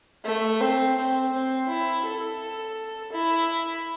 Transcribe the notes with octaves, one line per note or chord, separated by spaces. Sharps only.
A3
C4
C4
C4
E4
A4
E4